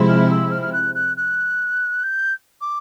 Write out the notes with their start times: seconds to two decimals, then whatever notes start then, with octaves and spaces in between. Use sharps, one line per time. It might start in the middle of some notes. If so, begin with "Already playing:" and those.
Already playing: C3 F3 G#3 C4 E4
0.08 F6
0.30 E6
0.51 F6
0.62 F6
0.72 F#6
0.94 F#6
1.17 F#6
2.03 G6
2.61 D6